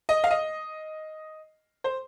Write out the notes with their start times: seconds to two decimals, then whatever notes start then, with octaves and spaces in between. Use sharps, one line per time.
0.09 D#5
0.24 F5
0.31 D#5
1.84 C5